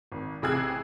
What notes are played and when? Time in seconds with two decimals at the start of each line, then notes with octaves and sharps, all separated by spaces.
0.12 G#1
0.42 A1 C3 G#4 E6 F#6 G#6